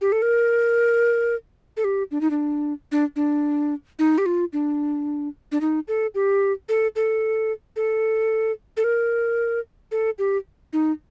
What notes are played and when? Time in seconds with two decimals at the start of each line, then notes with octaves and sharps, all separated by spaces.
0.01 G4
0.12 A4
0.22 A#4
1.77 A4
1.84 G4
2.11 D4
2.21 D#4
2.31 D4
2.92 D4
3.16 D4
3.99 D#4
4.18 G4
4.26 F4
4.53 D4
5.52 D4
5.61 D#4
5.88 A4
6.15 G4
6.69 A4
6.96 A4
7.76 A4
8.77 A4
8.84 A#4
9.92 A4
10.19 G4
10.73 D#4